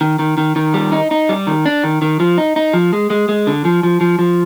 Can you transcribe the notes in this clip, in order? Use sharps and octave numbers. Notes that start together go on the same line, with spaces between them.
D#3
D#3
D#3
D#3
G3
D#4
D#4
G3
D#3
D4
D#3
D#3
F3
D#4
D#4
F3
G#3
G#3
G#3
D3
F3
F3
F3
F3